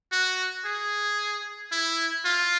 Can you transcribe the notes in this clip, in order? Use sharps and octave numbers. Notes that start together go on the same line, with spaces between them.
F#4
G#4
E4
F4